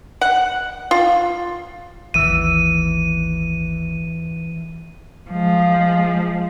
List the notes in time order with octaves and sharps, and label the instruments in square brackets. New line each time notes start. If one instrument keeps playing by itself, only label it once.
[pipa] F#5
F4
[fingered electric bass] G#1 D#2 [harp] E3 E6 [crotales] D#7
[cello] F3 G#3